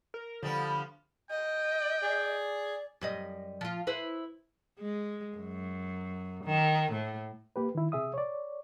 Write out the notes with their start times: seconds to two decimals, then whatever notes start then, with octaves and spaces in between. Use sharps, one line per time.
0.14 A#4
0.43 D3 F3 G3 B3
1.31 D#5 G5
2.03 G#4 D5
3.01 F#2 G3 D#5
3.61 F3 F4
3.87 E4 B4 C5
4.79 G#3
5.37 F#2
6.44 D#3
6.92 A2
7.56 A#3 G4 B4
7.75 D#3 E4
7.92 C3 G#4 E5 D#6
8.14 C#5 D5